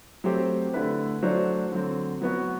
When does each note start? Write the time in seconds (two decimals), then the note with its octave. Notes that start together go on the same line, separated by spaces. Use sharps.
0.24 F#3 A3 C4 G4 C5
0.74 D3 A3 E4 B4
1.22 F#3 A3 D4 F#4 C5
1.72 D3 F#3 C4
2.22 F#3 B3 F#4